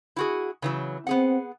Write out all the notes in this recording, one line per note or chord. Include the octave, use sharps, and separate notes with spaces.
E4 F#4 G#4
C#3 E3 F#3
B3 C4 G#4 F#5